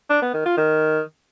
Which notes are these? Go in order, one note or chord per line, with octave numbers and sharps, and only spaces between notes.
D4
B3
D#3
F4
D#3